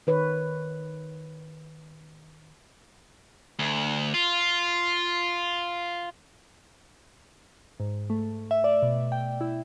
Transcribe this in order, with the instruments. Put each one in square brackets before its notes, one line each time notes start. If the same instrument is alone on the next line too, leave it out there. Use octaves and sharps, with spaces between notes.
[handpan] D#3 B4 C#5
[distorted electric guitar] D2
F4
[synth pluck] G#2
A3
E5
D5
B2
G5
E4